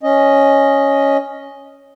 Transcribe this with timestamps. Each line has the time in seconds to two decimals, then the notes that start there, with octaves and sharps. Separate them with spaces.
0.03 C#4 D#5